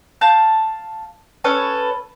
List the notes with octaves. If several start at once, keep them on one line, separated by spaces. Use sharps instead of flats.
F5 A5 G6
C#4 A4 B4 C#5